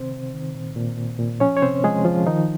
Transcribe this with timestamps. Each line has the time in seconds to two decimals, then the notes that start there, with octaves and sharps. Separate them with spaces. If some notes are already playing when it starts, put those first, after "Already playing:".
Already playing: C3 D#3 C4 C5
0.11 C3
0.33 D#3
0.55 A#2
0.76 A#2
0.97 A#2
1.19 A#2
1.40 F3 C#4 C#5
1.57 C#5
1.62 C3 C4 C5
1.84 F3 G#3 G#4
2.05 F3 F4
2.27 D#3 F3 D#4